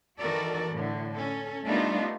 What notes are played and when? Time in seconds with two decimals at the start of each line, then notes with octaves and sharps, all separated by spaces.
0.19 D#3 E3 F#4 A4 A#4 D5
0.70 A2 D3
1.15 C#4 A4
1.65 G3 A3 B3 D4 D#4 F4